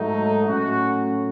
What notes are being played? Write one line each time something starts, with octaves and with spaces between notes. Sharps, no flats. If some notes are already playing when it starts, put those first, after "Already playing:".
Already playing: G#2 F#3 A3 D#4
A2 F#3 C#4 F#4